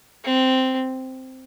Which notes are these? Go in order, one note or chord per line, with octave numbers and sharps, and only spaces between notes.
C4